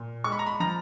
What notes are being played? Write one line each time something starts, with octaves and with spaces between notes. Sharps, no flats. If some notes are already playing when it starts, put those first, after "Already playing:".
Already playing: A#2
G#3 C#6
B5
A#5
B5
F3 A#5